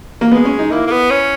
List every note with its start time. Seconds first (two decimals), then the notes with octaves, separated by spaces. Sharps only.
0.21 A#3
0.32 G#3 B3
0.45 C#4
0.59 D#4
0.71 A#3 E4
0.87 A#3
0.91 B3
1.11 C#4